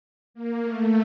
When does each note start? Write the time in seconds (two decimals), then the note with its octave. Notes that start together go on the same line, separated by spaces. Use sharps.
0.34 A#3
0.63 A3